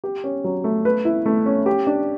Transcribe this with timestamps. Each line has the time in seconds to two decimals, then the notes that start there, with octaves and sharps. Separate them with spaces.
0.04 G4
0.24 C#4
0.44 F#3
0.64 A3
0.85 B4
1.05 E4
1.26 A3
1.46 C#4
1.66 G4
1.87 D4